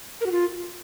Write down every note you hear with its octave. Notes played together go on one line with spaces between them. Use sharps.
A#4
F#4
F4